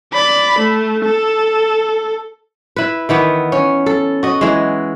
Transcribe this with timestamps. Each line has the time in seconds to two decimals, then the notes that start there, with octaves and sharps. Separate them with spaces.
0.13 D5 B5
0.59 A3
1.06 A4
2.76 E4 B4
3.09 D#3 E3 B3
3.52 C#4
3.86 A4
4.23 F#4 D#5
4.41 E3 G#3